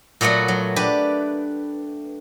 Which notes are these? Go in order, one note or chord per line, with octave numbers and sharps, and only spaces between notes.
A#2 F#3 A3 B3 F#4
F#3
D4 G4 B4